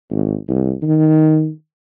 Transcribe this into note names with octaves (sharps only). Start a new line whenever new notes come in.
G#1
C2
D#3